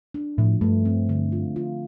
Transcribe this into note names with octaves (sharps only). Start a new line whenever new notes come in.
D4
A2 F3
G2 A3
C4
D3
F4
F4